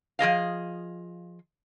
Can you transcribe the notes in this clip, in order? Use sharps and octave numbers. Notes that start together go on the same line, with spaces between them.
F3 G#4 D#5 F5